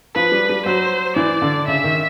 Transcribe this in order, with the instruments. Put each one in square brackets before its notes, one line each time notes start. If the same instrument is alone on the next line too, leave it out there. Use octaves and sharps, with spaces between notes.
[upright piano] F3 [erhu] B4
[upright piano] G3
G3
[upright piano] F#3 [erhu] C5
[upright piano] E3 [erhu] D5
[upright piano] D3
[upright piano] C#3 [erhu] E5
[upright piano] D#3